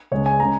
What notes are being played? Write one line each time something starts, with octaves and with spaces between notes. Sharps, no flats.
C#2 C#3 G#3 C#5
G#5
C#3 G#3 A#5